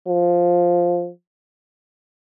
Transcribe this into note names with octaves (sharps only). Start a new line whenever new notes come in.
F3